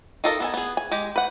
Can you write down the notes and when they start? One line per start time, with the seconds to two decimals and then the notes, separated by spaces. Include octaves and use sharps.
0.24 D#4 F4 A4 A#4 D#5
0.40 B3 A4 G#5
0.54 B3 G#4
0.77 G#5
0.92 G#3 G4
1.16 B4 F#5